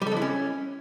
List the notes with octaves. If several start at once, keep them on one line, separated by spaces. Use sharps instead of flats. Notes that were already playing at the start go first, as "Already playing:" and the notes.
G3
A4
G#3
E4
C#4